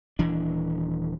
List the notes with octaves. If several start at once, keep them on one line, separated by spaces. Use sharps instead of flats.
D#1 E3 D4